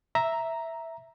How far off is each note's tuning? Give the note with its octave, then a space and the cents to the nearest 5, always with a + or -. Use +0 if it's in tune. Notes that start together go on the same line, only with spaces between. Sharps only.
E5 +0 A#5 +0